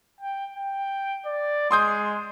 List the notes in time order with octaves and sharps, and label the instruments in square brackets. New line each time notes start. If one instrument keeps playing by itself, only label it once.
[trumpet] G5
G5
D5
[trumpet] G#3 [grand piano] C6 D#6 G6